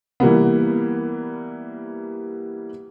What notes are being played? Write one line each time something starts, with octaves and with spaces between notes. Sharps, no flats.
E3 G3 A#3 B3